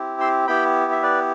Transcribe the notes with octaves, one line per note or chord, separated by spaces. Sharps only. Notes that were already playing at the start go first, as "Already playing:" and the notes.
Already playing: C4 E4 G4
C6 E6
B3 E4 G4 G5 B5
E5
B4 D5